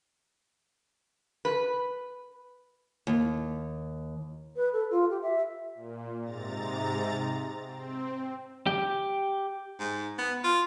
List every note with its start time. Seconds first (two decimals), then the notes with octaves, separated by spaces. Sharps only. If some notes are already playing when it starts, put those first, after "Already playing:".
1.45 B4
3.07 D#2
4.56 B4
4.73 A4
4.91 F4
5.10 G4
5.22 E5
5.74 A#2
6.23 G#2 C3 A#5 A6
7.64 C4
8.67 G4
9.79 G#2
10.19 B3
10.44 F4